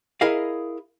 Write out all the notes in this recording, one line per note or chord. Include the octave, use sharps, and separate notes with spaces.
E4 G#4 A#4 D#5 F5